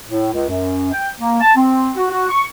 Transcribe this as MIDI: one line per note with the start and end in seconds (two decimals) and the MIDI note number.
0.08 0.29 45
0.33 0.46 37
0.49 0.92 42
0.92 1.09 79
1.19 1.37 58
1.41 1.52 81
1.56 1.91 60
1.96 2.05 66
2.10 2.27 66
2.29 2.44 85